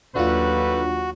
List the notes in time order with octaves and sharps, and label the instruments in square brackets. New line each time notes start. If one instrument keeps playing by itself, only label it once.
[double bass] D#2 F#3 [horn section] G3 A3 B4 [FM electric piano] D4 F4 [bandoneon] F#4